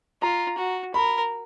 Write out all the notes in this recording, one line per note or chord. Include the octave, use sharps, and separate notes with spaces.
F4 A#5
F#4
A#4 B5